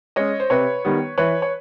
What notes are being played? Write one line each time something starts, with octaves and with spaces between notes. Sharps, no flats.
G#3 C#4 C#5 D#5
C5
C3 B4 C#5
D#3 G3 B3
E3 B4 C#5
C#5